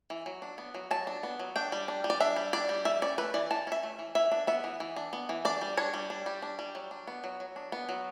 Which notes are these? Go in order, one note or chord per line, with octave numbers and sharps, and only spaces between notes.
E3
F#3
D4
B3
F#3
F#3 A5
D4
B3
F#3
D4 G5
G3
D4
G3
D5
D4 E5
G3
D4 D5
G3
E3 E5
C#4 D5
A3 B4
E3 D5
E3 A5
C#4 E5
A3
E3
E3 E5
D4
B3 E5
E3
E3
D4
B3
E3
D4 D5
G3
D4 C#5
G3
D4
G3
D4
G3
F#3
D4
B3
F#3
F#3
D4
B3
F#3